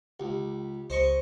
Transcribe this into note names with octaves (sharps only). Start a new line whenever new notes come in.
C#2 G4
C#2 C5 D#5 C#6